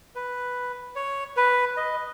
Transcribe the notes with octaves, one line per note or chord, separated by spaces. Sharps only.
B4
C#5
B4
D#5